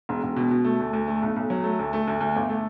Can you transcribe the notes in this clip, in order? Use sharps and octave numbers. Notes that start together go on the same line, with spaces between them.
E1
E1
B2
B2
A3
D2
D2
A3
B1
B1
F#3
A3
D2
A3
D2
D2
G1
A3